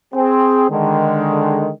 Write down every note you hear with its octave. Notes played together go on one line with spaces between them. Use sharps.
C4 G#4
D3 D#3 G#3